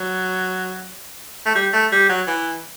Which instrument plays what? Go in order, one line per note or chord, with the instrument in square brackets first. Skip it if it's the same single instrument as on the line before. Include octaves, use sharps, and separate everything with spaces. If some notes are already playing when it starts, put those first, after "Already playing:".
Already playing: [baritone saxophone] F#3
A3
G3
A3
G3
F#3
E3